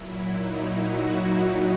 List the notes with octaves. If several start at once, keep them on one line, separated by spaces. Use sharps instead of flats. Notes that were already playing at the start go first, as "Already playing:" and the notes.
Already playing: A#2 F#3 E4
D#4
F#4